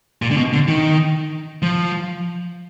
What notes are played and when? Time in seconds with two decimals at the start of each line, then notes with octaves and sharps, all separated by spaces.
0.22 A#2
0.31 D3
0.37 B2
0.53 D3
0.68 D#3
1.62 F3